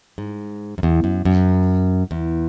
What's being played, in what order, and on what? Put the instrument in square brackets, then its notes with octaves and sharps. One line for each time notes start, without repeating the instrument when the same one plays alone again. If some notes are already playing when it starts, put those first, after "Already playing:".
[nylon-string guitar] G#2
F#2
E2
F#2
F#2
E2